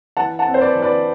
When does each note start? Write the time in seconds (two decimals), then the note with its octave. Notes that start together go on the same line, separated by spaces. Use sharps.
0.17 E3 F#5 A5
0.39 F#5 A5
0.46 C4
0.54 C5
0.60 B4 D5
0.75 E3
0.82 B4 D5